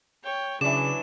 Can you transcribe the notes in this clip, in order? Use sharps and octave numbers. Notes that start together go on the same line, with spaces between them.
C#5 G5
C#3 E3 F#3 D4 D5 E7